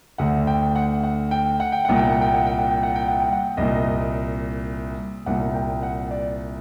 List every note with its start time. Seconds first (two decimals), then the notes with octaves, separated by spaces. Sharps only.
0.18 D2 D3 F#5
0.47 G5
0.75 F#5
1.04 F#5
1.31 G5
1.60 F#5
1.72 G5
1.85 C2 A#2 F#5
1.97 G5
2.09 F#5
2.21 G5
2.34 F#5
2.46 G5
2.58 F#5
2.71 G5
2.83 F#5
2.95 G5
3.08 F#5
3.20 G5
3.33 F#5
3.57 C2 A#2 D#5
5.26 C2 A#2 F#5
5.54 G5
5.83 F#5
6.11 D5